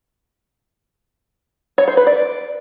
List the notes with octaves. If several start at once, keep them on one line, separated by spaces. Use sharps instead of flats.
C#5
C5
B4
D5